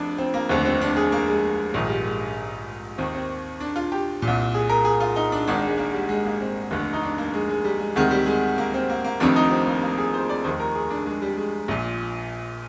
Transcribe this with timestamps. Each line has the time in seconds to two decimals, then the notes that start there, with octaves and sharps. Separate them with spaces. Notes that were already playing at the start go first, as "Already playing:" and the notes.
Already playing: F1 F2 D4
0.18 C4
0.34 A#3
0.49 F1 D#2 D3 C4
0.65 C4
0.81 D4
0.97 G#4
1.12 A#3
1.28 G#3
1.74 A#1 G#2 D#3 G#3
1.89 G3
2.05 G#3
2.98 D#2 D#3 C4
3.14 C4
3.60 D4
3.76 F4
3.92 G4
4.22 A#2
4.27 C2
4.54 G#4
4.69 A#4
4.85 G#4
5.00 F4
5.16 D#4
5.32 D4
5.47 G#1 G#2 D#3 D4
5.67 G#3
5.78 A#3
5.94 G3
6.09 G#3
6.25 A#3
6.41 C4
6.71 F1 D#2 D3
6.93 D#4
7.03 D4
7.18 A#3
7.34 G#3
7.49 G#3
7.64 G3
7.80 G#3
7.96 D2 C3 D#3 G#3
8.11 G3
8.26 G#3
8.58 A#3
8.74 C4
8.90 A#3
9.04 A#3
9.20 F1 F2 C3 D#3 D4
9.36 D#4
9.51 C4
9.67 A#3
9.82 A#3
9.98 G#4
10.14 C5
10.29 D5
10.44 F1 D#2 D#3 C5
10.60 A#4
10.75 G#4
10.90 D4
11.06 G#3
11.22 G3
11.37 G#3
11.68 A#1 A#2